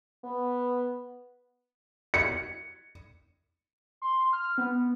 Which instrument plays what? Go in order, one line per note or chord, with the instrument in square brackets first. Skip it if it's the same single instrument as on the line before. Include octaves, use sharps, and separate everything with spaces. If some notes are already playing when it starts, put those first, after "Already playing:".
[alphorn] B3
[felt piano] C#7
[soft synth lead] C6
F6
B3